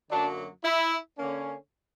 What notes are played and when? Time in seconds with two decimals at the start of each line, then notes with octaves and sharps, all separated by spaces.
0.09 F#2 D3 F#3 A#3 D4
0.64 E4
1.18 D3 A#3 C#4